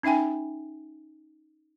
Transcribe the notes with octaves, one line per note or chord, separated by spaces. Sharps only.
C#4 D#4 E5 G5 G#5